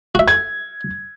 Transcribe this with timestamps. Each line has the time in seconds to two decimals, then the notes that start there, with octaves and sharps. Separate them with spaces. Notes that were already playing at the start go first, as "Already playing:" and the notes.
0.15 F#4 E5
0.28 G#6